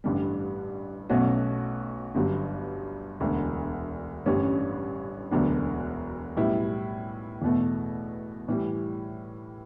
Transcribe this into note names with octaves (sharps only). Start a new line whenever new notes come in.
A1 G2 D3 G3
B1 B2 A3 C#4 F#4
G1 G2 F#3
E1 D2 D3
A1 G2 D3 G3 C#4
E1 D2 D3 F#3 B3
B1 A2 G3 B3 E4
E2 B2 A3
A2 E3 G3